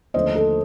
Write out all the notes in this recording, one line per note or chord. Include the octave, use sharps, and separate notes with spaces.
D#2 D3 F3 A3 C5 D#5
A4